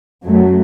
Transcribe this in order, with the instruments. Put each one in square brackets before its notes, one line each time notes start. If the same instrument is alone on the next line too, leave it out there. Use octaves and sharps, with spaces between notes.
[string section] F#2 F#3 A3